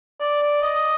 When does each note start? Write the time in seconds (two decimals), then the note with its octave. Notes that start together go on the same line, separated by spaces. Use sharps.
0.20 D5
0.41 D5
0.62 D#5